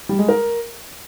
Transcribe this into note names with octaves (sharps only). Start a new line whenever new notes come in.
G3
G#3
A#4